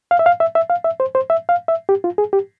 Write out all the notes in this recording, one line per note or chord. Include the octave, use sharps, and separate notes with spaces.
F5
E5
F5
E5
E5
F5
E5
C5
C5
E5
F5
E5
G4
F4
G#4
G4